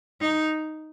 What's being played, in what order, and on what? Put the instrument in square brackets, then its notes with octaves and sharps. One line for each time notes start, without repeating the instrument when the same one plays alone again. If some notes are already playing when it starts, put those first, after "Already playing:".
[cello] D#4